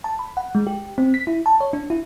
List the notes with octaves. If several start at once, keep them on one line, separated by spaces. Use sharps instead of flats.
A5
B5
F#5
G#3
G4
C4
B6
E4
A5
C#5
D4
E4